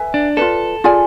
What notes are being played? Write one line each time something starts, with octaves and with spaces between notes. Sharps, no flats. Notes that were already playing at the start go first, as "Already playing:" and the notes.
Already playing: B4 E5 G#5
D4
F4 A4 B4 D5
F4 G#4 D5 G#5